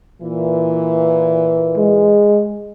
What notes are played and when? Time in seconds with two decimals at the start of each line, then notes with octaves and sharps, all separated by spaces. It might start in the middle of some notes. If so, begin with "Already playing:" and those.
0.22 A#2 E3
1.77 G#3